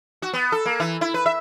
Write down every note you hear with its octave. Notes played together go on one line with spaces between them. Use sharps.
F#4
B3
A4
A#3
E3
E4
B4
E5